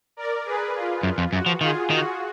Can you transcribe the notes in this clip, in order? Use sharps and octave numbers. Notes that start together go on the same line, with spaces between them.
A#4 D5
G#4 B4
F4
F#2
F2
F#2 F#4
F3
D#3 F4 G#4
D#3 F#4